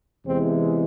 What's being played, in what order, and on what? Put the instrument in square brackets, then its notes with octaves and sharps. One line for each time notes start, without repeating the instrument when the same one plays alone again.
[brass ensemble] E2 C3 E3 G#3 C4